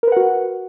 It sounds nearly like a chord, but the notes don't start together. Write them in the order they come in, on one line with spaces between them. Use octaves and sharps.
A#4 B4 F#5 F#4